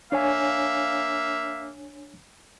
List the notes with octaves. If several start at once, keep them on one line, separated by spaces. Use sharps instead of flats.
A#3 D4 C#5 E5 F5 G#5